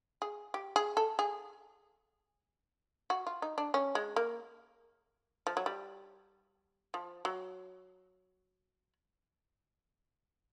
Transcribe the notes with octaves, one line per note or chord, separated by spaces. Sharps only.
G#4
G4
G#4
A4
G#4
F#4
F4
D#4
D4
C#4
G#3
A#3
F3
F#3
G3
F3
F#3